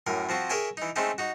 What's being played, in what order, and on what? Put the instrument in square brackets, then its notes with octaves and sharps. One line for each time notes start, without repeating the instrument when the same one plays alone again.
[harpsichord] F#2 A2 A#4
F3 C4 F#4
G#4 A#4 C#5 E5 G5 G#5
E3 D#4
G#3 A3 C4 C#4 D#4 E5
D#4 F#4